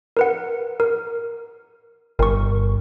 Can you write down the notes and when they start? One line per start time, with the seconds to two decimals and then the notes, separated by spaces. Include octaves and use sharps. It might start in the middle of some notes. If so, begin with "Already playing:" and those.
0.17 A#4 B4 F#5
0.80 A#4
2.19 G1 A#4 C#6